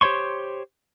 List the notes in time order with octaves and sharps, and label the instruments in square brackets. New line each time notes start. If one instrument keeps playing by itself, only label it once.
[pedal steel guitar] G4 C5 C#5 C6 C#6